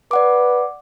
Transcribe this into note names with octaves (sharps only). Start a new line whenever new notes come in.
B4 D5 F#5 D6